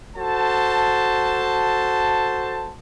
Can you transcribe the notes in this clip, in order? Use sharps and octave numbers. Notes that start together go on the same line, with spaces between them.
F#4 A4 C5 A5